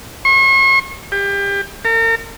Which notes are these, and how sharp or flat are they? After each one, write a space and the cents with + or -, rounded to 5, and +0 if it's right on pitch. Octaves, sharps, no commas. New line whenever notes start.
C#6 -45
G4 +30
A#4 -40